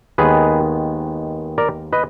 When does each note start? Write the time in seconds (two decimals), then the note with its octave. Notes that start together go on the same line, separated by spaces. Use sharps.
0.18 D#2 D#3 G#3 B3 G#4 B4
1.58 A#4 D5
1.93 B4 D#5